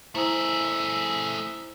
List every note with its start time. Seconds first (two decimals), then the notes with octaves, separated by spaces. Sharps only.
0.15 A3 E4 G#4 C5 E5 A#5